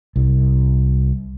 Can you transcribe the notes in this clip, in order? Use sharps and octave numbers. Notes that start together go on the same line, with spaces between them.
C2